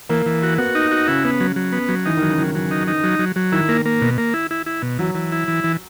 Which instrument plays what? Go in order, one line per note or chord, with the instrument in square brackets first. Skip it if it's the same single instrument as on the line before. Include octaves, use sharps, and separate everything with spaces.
[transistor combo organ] E3 [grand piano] A#3
[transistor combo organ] E3
F#4
[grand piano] B3 [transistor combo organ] F#4
[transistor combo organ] D#4
F#4
[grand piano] C#3 [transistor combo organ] E4
[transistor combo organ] B3
F#3
F#3
B3
F#3
[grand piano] E3 [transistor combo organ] D#4
[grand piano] D#3
[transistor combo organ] F#3
[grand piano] C#3
[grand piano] D#3 [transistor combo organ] F#3
[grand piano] C#3 [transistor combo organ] F#3
[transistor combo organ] D#4
D#4
F#3
F#3
F#3
[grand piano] D#3 [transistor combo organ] E4
[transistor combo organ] A#3
A#3
B2
A#3
E4
E4
E4
B2
[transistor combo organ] E3 [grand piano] F#3
[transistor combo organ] E3
E4
E3
E3